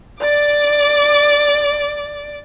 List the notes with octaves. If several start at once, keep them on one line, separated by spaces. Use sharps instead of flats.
D5 D6